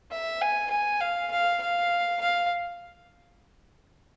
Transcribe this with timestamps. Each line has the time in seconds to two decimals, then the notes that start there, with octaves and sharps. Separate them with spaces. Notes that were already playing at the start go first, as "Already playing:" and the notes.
0.11 E5
0.41 G#5
0.70 G#5
1.00 F5
1.31 F5
1.61 F5
2.21 F5